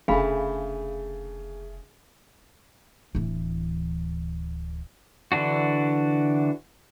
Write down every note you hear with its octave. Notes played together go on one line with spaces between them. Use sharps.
F1 C#3 A3 D4 G#4 F5 B5
D1 E3
D3 E3 D4 F#4